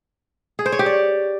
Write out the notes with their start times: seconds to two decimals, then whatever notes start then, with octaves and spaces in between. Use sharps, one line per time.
0.59 G#4
0.66 C5
0.72 C#5
0.79 G4
0.86 D5